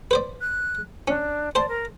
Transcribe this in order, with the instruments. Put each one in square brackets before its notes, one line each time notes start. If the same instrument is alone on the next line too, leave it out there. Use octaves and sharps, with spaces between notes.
[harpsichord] B4 C5 D5
[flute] F#6
[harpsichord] C#4 [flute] D4
[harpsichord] C5 A5 C6 [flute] D5
[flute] A#4